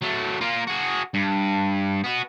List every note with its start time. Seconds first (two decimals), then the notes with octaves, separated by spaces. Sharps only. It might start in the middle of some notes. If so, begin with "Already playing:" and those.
0.02 F#3 A3
0.41 A#3 F4
0.67 F#4 G#4
1.14 G2
2.04 B3 F#4